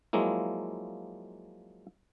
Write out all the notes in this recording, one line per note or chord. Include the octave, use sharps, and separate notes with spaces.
F3 F#3 G#3 A#3 E4